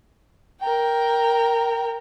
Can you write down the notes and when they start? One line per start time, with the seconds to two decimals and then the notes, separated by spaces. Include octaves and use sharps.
0.61 A#4 G5